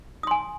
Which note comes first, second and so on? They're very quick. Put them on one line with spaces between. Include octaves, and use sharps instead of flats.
D#6 C6 G#5